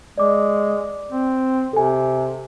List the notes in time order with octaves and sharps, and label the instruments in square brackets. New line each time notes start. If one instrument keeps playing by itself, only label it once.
[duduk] G#3 [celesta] D5 D6
[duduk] C4
[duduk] C3 [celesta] A4 G#5